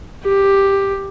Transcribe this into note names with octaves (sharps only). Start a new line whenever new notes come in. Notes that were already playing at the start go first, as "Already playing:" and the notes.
G4